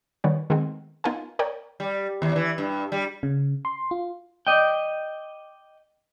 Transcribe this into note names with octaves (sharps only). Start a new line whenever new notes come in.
D#3 G3 B3 C#5
D#3 G#3 B3 C4
B3 D#4 F4 A#4 G#5
A#4 C#5 D5 G5 A#5
G3
D#2
E3
G2
G3
C#3
C6
F4
D5 D#5 G5